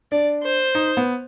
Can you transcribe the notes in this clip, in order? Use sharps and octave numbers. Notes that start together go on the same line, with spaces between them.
D4 D5
C5
D#4
B3